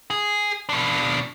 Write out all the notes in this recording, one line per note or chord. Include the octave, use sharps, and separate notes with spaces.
G#4
B2 D4